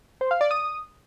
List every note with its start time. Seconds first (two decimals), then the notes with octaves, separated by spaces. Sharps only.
0.21 C5
0.31 F5
0.41 D5
0.51 D#6